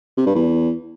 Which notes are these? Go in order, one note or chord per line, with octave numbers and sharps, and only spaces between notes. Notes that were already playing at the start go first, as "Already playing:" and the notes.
C3
G2
E2